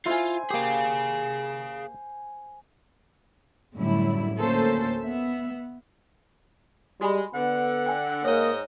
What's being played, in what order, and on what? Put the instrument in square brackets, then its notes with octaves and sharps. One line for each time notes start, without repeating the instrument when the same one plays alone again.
[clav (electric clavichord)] E4 [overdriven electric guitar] F4 [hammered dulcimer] C5 G#5
[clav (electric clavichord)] A#3 G4 [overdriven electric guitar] G#4 F5
[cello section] F#2 A2 D3 G3 E4
D2 A#3 C#4 A4 C5
B3 E5
[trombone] G3 [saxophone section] G#3 [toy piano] F#4 G#5 B5
[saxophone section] D3 [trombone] B3 [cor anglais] F#5
[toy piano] G5 G#5
[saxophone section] G#2 D#5 [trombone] A#3 [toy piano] C#5